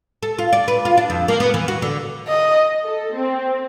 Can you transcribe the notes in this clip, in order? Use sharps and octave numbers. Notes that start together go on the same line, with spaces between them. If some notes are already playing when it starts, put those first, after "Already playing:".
A4
F4
D5
B4
F4
D4
F2
A#3
B3
E3
F#4
D3
D#5
A4
C4